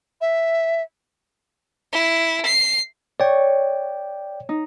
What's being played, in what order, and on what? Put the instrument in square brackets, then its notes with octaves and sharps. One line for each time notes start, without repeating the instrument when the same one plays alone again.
[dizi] E5
[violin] E4
C7
[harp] C#5 [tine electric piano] D5 G5
[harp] D#4